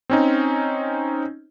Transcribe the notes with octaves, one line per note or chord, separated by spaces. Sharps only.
C4 C#4 D#4